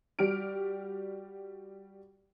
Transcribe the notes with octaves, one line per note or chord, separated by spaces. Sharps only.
G3 F#4 G4 F6 D7